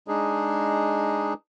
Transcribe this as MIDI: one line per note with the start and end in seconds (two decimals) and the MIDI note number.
0.08 1.34 56
0.08 1.34 62
0.08 1.34 63
0.08 1.34 68